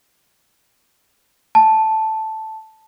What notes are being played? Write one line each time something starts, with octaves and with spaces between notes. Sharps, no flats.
A5